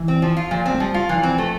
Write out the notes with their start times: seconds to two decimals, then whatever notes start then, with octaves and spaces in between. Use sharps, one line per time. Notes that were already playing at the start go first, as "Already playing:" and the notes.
Already playing: E3
0.08 C4
0.22 F3
0.37 F4
0.51 A#2 F3
0.66 C4
0.74 A3
0.80 F3 G3
0.94 F4
1.09 E3 F3
1.23 C4
1.38 A3